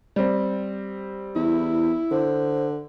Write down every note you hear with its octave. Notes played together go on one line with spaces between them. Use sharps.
G3 C4
E2 E4
D3 C5